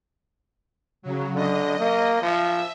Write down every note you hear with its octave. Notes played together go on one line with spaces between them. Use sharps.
C#3 F#3
D3 D#5
A#3
F3 E5